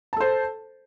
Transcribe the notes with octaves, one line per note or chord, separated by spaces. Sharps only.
A4 C5 A5